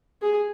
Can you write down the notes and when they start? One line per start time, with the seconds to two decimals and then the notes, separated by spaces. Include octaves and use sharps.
0.22 G#4